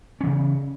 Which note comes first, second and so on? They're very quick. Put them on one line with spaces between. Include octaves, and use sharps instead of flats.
C#4 E3 C#3